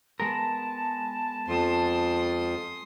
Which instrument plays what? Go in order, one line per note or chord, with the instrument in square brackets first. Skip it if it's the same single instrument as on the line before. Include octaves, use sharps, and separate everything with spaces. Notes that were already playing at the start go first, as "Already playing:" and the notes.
[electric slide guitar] G#3 B3 A#4 [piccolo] A5
[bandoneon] F2 [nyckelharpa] C6 D#6